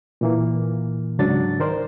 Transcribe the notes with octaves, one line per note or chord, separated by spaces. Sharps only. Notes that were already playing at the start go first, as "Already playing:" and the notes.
A#2 E3 A#3
C#2 G#2 C#3 F#3 D4 A6
D#3 A#4 C5 D5